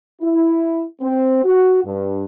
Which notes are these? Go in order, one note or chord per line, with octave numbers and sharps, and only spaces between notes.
E4
C4
F#4
G2